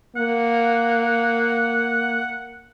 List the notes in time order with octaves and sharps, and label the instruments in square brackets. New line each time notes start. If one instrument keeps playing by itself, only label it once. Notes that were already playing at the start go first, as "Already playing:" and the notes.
[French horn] A#3 [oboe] F#5